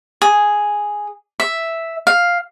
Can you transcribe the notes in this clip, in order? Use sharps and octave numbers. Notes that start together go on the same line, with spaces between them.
G#4
E5
F5